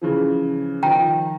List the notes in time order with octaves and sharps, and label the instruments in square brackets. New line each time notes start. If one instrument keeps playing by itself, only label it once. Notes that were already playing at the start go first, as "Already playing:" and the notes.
[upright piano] C#3 E3 F3
[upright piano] D#3 F3 [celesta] G5 A#5